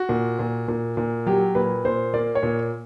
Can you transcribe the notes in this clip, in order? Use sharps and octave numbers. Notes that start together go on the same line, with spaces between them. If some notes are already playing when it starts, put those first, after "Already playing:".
Already playing: F#4
A#2
A#2
A#2
A#2
F#3 G4
A#2 B4
A#2 C5
A#3 D5
C#5
A#2